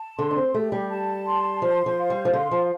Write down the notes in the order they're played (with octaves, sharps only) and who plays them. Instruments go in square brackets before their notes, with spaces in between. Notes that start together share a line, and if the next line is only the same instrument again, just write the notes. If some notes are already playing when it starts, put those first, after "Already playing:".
Already playing: [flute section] A5
[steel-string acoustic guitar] D3 [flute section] C6
[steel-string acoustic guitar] D4
C4
[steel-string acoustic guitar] A3 [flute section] G4
[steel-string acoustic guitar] G3
[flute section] A5
C6
[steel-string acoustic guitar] F3 [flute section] C5
[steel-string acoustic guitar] F3
[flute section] F5
[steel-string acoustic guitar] G3
F3
[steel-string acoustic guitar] D3 [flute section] C6
[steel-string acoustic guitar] F3